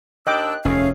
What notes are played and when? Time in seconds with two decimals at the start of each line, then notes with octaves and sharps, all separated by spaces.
0.27 D#2 D4 D#5 G5 D6 E6 F#6
0.65 F1 D#2 A3 C#4 G#4 F5